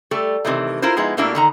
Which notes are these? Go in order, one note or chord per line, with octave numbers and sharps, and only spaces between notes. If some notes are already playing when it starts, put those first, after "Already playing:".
G3 A3 A4 D5
C3 D#3 E3 A3
E4 F4 A#4 C5
F3 G#3 B3 D#4 E4
B2 G3 A3 A#3 D4 E4
D3 D#3 A#5